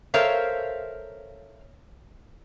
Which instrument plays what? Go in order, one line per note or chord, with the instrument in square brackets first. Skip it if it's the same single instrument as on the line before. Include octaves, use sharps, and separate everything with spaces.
[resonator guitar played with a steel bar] A4 A#4 C5 C#5 E5 F5